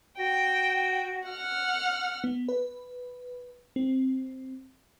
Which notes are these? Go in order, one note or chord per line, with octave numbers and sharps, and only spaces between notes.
F#4 G5
F#5 F6
B3
B4
C4